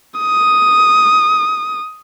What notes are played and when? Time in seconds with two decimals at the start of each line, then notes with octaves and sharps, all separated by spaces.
0.20 D#6